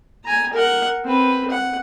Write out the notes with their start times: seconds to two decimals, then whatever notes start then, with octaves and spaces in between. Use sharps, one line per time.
0.24 G#5 A#5
0.53 A#4 F#5
1.04 C4 B4
1.50 F#5